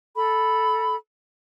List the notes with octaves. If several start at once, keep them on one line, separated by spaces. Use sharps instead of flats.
A4 B5